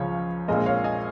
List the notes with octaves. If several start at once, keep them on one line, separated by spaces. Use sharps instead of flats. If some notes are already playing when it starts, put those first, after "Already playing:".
Already playing: C#2 C#3 F3 C#5
A#1 A#2 G#3 A#4 D#5
C#5 F5
D#5 G#5